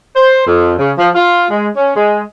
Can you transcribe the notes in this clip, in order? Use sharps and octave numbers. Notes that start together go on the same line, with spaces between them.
C5
F2
C#3
F3
F4
G#3
C#4
G#3